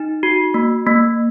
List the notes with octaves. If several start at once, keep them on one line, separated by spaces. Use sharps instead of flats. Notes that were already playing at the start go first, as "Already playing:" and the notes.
Already playing: D#4
F#4
A#3
A#3